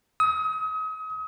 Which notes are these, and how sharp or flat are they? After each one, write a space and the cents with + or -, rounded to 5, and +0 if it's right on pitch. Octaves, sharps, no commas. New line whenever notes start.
D#6 +35